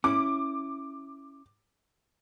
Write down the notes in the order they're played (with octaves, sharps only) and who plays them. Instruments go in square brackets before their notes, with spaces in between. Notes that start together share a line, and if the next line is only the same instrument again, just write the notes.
[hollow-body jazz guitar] C#4 E4 [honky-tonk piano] D6